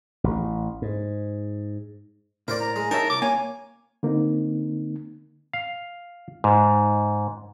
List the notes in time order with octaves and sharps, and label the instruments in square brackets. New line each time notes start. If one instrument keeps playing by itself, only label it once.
[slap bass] A1
G#2
[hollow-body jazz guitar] A2 [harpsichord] A#4 C5 D5
[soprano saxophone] A#5
[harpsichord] G#3
[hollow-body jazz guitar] D#4 C#5 E5 [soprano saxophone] A#4 [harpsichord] A5
[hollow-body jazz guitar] C2 [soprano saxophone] D6
[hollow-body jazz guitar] A#3 C#5 [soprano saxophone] G#5
[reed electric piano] D3 A#3 C4 D#4
[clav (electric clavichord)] F5
G#2